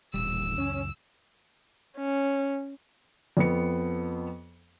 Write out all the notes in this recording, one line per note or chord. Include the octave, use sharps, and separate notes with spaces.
D#1 A1 G3 E6
C#2 F#2 C#4
C#4
F2 B3 C#7